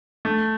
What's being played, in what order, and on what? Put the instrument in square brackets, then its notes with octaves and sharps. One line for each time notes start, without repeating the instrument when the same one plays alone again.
[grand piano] A3